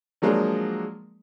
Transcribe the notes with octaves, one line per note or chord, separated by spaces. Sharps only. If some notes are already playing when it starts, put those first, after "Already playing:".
F3 F#3 G#3 A#3 D4